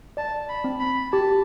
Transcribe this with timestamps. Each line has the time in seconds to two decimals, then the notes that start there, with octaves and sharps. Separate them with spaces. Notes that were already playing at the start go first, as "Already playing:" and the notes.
0.17 D5 A5
0.49 B5
0.64 C4
0.80 B5
1.13 G4 A5